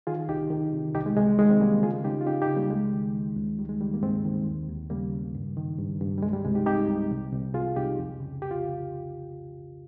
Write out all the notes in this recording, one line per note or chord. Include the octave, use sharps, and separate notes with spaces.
D#3 F4 G#4
C2 D#4 G4
D#3
C3
C2 D#4 G4
G#3
C2 G#3
D#3 G#3
C4
C2 G3 A#3
C#3 F4 G#4
C#3 D#4 G4
F4
C#3 D#4 G4
D#4 G4
C#3
G3 A#3
C#2 G#3
D#3
D#3
C#2
D#3 G3
G#3
D#3 G3
A#3
G2 G#3 C4
D#3
D#2
D#2
C#3 G3 A#3
C#3
G2
D#3
G2
G2
G3
C2 G#3
G3
C2 G#3
D#4 G4
C3 D#4 G4
C2
C2
C2
C2 F4 G#4
C2 D#4 G4
F2
C#3
G4
F4